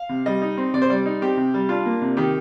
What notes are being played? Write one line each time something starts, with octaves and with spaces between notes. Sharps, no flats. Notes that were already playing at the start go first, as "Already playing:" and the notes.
Already playing: F5
C3
G3 D#5
D#4
C4
C3 D5
C5
G3 D5
D#4
C4 G4
C3
G3
D4 F4
A#3
C3
D#3 G4